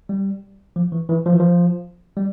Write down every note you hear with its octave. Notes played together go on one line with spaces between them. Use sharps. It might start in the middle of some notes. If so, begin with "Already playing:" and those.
G3
F3
E3
E3
F3
E3
F3
G3